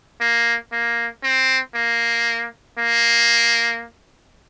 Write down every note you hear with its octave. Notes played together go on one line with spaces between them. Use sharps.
A#3
A#3
C4
A#3
A#3